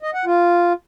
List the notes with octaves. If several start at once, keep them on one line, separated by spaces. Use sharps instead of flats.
D#5
F#5
F4